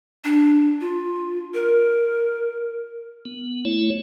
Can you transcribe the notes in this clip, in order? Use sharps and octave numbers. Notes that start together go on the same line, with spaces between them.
D4
F4
A#4
B3
A3 E4 C#5